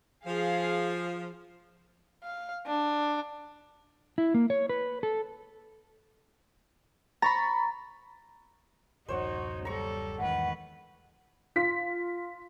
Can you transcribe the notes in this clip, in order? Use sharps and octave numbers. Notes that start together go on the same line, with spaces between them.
F3 G#4 F5
F5
D4
E4
A#3
C#5
B4
A4
A#5 B5 C#6 A6
D1 F#2 D#4 F#4 C5 C#5 F#5
G3 A4 A#5 C#6
E2 G#2 D#3 B4 F#5
F4 B6